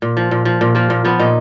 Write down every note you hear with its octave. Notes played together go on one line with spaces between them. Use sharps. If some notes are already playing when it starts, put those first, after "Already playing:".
A#2
F3
A#2
F3
A#2
F3 A#3
A#2
F3 B3
A#2 D#4